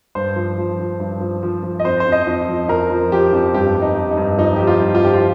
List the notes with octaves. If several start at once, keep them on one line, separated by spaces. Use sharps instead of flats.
G2 C5
F3
F3
F3
G2
F3
F3
F3
D#5
F2 C5
C5
F2
D#5
F2
F3
F2 A#4
F3
F3 G4
F2
G2 G4
G2
D#4
G2
D#4
G2
F3 D#4
F3 G4
F4
G2
F4
F3 G4
F4